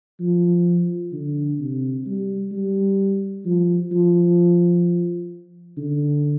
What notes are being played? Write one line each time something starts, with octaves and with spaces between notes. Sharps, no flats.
F3
D3
C3
G3
G3
F3
F3
D3